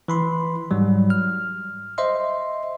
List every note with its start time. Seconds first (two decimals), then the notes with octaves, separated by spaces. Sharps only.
0.08 E3 B5 C6
0.71 G#2 F#3 G3
1.10 F6
1.98 C5 D#5 E5 C6